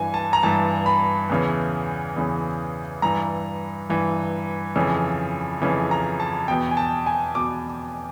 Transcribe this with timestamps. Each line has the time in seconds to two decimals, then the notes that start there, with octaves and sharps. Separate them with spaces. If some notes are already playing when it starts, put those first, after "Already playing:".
Already playing: G2 E3 G#5
0.14 A5
0.33 A#5
0.43 G2 E3 A5
0.86 B5
1.30 E2 C#3 E3
2.16 E2 C#3 E3
3.02 G2 E3 A#5
3.89 G2 E3
4.76 F2 C#3 E3
5.62 F2 C#3 E3
5.91 A#5
6.20 A5
6.48 E2 B2 G5
6.71 G#5
6.77 A5
7.06 G#5
7.35 E2 B2 D6